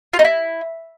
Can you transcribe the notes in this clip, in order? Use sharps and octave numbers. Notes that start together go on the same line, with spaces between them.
F4
D#4
E4